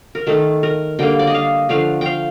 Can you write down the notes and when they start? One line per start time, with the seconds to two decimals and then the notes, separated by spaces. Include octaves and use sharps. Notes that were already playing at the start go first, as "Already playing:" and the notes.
0.15 A#4
0.27 D#3 A3 A4
0.63 A#4
0.99 D3 G3 A#3 G5
1.19 D5
1.27 D#5
1.34 F5
1.69 D3 F3 A3 F5
2.01 F5 G5